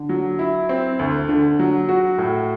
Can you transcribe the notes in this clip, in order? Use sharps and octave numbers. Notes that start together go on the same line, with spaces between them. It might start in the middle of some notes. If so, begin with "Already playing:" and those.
Already playing: D3
F#3
E4
C4
D2
D3
F#3
F#4
A2